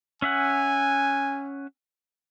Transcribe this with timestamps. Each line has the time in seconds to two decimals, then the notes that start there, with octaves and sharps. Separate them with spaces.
0.22 C#4 E5 F#5 G#5